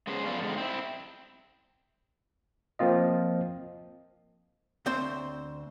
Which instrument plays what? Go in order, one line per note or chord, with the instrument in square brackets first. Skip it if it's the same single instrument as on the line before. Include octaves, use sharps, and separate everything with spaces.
[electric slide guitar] G#3 B3 C#4 G#4 C5
F#2 D3 F3 B3 D5 F5
G#2 D3 G#3 C4
C4 E4
[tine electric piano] F3 A#3 C4 F4 D#5
[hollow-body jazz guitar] D2 C4 C5 C6